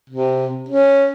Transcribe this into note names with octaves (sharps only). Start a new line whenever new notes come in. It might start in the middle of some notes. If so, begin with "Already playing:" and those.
C3
C#4